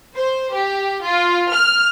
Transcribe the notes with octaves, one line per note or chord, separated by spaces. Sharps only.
C5
G4
F4
F6